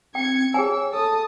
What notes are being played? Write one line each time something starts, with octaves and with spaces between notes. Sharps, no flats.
C4 G5 G#6 C#7
G#4 C#5 G5 G#5 E6
A4 A5 D#6